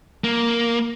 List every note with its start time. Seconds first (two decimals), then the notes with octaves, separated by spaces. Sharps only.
0.24 A#3